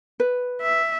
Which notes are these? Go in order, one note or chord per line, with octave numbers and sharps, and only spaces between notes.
B4
E5